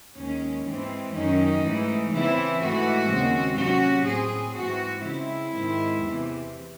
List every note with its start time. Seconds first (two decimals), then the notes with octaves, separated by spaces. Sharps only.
0.16 D#2 D#3 G#3 C#4
0.65 G#2 E3 G#3 C4
1.13 F#2 D#3 F#3 C#4 D#4
1.62 G#2 E3 A3
2.11 C#3 E3 C4 E4
2.60 G#2 E3 A3 F#4
3.09 D#2 C#3 G#3 C4
3.57 C3 F#3 C#4 F#4
4.06 A2 F#3 C4 G#4
4.55 G#2 E3 C4 F#4
5.04 C#3 G#3 C4 E4
5.53 G#2 D#3 G#3 C4
6.02 E2 C3 E3